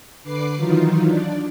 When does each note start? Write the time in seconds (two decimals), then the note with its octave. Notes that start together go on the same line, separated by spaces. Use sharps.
0.23 D3 B4 D6 C7
0.56 D#3 E3 F#3 D#4 F4
1.07 D4 D5